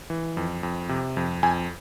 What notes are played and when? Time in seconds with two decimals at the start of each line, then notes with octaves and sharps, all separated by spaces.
0.10 E3
0.37 F2
0.63 F2
0.89 C3
1.17 F2
1.43 F2 G#5